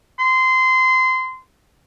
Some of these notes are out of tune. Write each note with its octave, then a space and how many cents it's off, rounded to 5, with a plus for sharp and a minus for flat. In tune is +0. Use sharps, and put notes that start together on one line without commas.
C6 -20